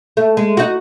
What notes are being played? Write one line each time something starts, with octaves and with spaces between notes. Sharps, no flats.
A3
G#3
D#4 F#4